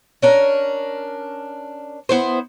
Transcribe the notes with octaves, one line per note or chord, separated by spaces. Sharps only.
C#4 D4 A#4
B3 E4 C5